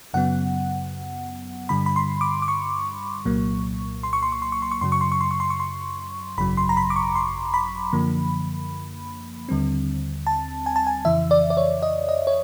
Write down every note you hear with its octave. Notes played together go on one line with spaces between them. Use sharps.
F#2 C#3 F#3 B3 F#5
G2 D3 G3 B5
B5
C6
D6
D6
C#6
C2 A#2 F#3 A#3
C6
C#6
C6
C#6
C6
C#6
C6
C#6
F#2 C#3 F#3 C6
C#6
C6
C#6
C6
C#6
C6
C#6
C6
G#1 F#2 C#3 F#3 B5
C6
A#5
B5
D6
C#6
C6
B5
F#2 D3 F3 A#3
D#2 D3 G3 C4
A5
G#5
A5
G#5
F2 C#3 E3 E5
D5
D5
C#5
D#5
D#5
C#5